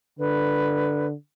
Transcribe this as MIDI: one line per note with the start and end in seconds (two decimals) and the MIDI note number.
0.19 1.14 50
0.19 1.07 71